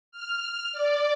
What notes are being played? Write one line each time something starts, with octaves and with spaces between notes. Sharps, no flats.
F6
D5